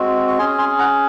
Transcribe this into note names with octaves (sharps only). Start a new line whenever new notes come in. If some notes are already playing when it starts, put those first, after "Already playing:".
Already playing: G#3 C4 F#4
C#6
C#4 G#4 G#5 C6
G#5 C6
F#5 A#5